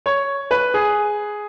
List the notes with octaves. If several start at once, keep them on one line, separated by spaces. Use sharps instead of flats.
C#5
B4
G#4